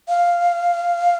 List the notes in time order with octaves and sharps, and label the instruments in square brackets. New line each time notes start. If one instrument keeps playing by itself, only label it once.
[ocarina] F5